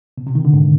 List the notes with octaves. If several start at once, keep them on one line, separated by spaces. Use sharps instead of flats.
B2
C3
D#3
D3
G#2